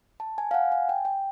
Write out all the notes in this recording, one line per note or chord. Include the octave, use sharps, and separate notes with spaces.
A5
G#5
F5
F#5
G#5
G5
G5